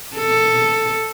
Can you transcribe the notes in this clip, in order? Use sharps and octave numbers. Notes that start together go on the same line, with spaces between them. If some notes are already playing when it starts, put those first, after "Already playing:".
A4